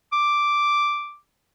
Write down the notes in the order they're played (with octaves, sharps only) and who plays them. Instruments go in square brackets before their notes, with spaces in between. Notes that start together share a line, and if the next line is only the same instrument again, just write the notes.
[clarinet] D6